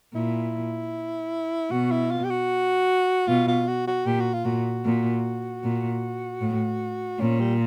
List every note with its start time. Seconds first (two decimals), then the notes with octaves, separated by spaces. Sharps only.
0.14 A#2 E4
1.71 B2 F#4
1.91 E4
2.11 F4
2.24 G4
2.30 F#4
3.27 B2 F4
3.48 F4
3.68 F#4
3.87 F#4
4.06 A#2 G4
4.20 F#4
4.33 F4
4.45 A#2 F#4
4.85 A#2
5.63 A#2
6.41 A2
7.20 A#2 C#4
7.40 G3